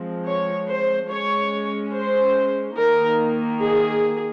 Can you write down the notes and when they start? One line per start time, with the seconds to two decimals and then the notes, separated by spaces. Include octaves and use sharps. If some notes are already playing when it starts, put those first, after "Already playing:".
Already playing: F3 G#3 C4
0.26 C#5
0.68 C5
1.10 G#3 C#4 C#5
1.94 C5
2.77 D#3 A#3 D#4 A#4
3.61 G#4